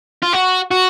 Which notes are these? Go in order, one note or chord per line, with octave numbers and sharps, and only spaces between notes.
F4
F#4
F#4